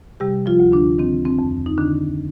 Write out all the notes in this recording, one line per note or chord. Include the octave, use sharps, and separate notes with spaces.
C3 G3 G4
F3 F4
D2
D3 D4
D#3 C4
C4
F2
D#4
D3 D#3 D4